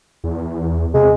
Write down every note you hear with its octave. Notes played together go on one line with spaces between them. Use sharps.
E2
C3 G#3